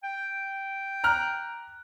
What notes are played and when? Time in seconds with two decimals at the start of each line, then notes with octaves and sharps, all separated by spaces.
0.04 G5
1.04 A#5 F6 F#6